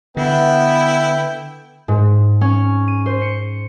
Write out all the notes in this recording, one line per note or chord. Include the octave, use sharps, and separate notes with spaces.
D3 B3 E4 G5
G#2
C#4
D#7
C5
C#7